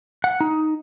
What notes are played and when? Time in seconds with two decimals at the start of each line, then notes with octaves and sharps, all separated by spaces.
0.24 F#5
0.40 D#4